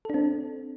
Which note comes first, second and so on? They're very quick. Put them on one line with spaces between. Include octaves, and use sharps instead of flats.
A4 D4 C4